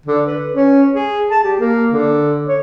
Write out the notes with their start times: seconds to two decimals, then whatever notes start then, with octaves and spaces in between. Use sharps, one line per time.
0.06 D3
0.27 B4
0.53 C#4
0.94 G#4
1.31 A5
1.44 G4
1.60 A#3
1.92 D3
2.47 C#5